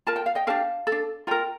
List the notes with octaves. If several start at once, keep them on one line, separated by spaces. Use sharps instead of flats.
F4 A#4 A5
G5
F5
D#5 G5
D4 G4 A#4 F5 A5
A4
D4
F4 A#4 G5 A#5